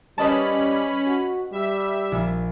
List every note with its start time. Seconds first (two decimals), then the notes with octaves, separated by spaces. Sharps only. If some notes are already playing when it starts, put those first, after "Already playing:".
0.18 G3 C#4 B4 D#5 A5 B5
1.06 F#4
1.52 G3 E5
2.12 A#1